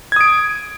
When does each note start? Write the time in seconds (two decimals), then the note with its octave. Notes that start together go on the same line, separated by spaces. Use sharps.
0.12 G#6
0.16 D#6
0.21 D7